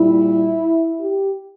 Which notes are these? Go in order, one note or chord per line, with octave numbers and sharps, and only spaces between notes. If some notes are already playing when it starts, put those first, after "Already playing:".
Already playing: A#2 G3 E4
G4